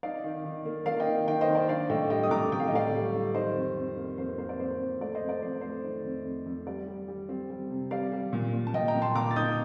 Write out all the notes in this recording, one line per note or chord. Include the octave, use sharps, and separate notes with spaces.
D#4 D5 F5
D#3
D#3
A#3
A#3 D5 F5
D#5 G5
D#3
D#3 D#5 G5
C5 D#5
D#3
D5
D4 D5 F5
A2 D#5 G5
G3 D#5 G5
D#6
A2 A#5 D6
A2 G5
F5
D#5
A2 D5 F5
G3
G3
D#3 C5 D#5
F2
F2
A#3
F2 C5
A#3 C5
D5
F2 C5
F2
A3 D5
C5 D#5
F2
D5
F2 C5
A3 C5
D#3
F2
F2
F2
G3 D5
G3
G3
C4
G3
C3
G3 D5 F5
G3
A#2
A#2
A5
A#2 D#5 G5
G5 A#5
A#2
A5 C6
A#2 A#5 D6
A6
D#4 D#6 G6